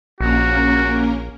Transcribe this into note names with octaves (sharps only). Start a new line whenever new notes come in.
A#1 A#3 C#4 F#4 A#4